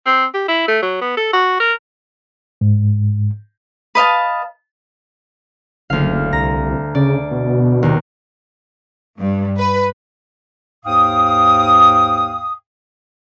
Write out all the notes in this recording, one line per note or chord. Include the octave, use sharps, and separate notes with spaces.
C4
G4
E4
A3
F#3
B3
A4
F#4
A#4
G#2
B4 D#5 F5 A5
F#1 D2 F5
C2 A#5 A#6
C#3 D5
B2
D#2 C3
G2
B4
D#2 G#2 F5 G5 D#6